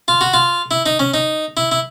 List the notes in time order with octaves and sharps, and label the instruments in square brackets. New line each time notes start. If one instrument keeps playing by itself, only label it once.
[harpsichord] F4
F#4
F4
E4
D#4
C#4
D#4
E4
E4